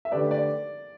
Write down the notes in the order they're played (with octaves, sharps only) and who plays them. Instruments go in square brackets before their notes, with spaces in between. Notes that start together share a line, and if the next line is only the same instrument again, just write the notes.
[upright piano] E5
[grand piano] D3 A3 G4 B4 [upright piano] D5
[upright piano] D5